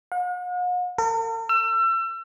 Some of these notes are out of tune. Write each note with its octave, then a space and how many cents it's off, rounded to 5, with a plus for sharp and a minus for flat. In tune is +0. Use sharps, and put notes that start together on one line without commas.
F#5 -45
A#4 -45
E6 +35